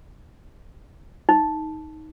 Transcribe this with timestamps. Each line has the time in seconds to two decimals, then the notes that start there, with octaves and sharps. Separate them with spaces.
1.29 D#4